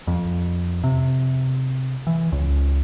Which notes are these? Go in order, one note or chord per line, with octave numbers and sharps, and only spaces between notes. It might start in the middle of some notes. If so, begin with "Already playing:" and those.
F2
C3
E3
C#2